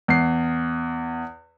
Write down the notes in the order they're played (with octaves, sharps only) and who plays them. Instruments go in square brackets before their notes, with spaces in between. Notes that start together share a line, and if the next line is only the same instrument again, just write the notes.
[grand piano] E2 C7